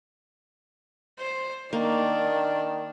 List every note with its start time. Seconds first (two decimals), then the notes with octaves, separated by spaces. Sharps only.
1.19 C5
1.73 D#3 A#3 D4